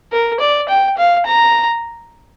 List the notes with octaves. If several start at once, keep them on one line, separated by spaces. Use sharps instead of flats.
A#4
D5
G5
F5
A#5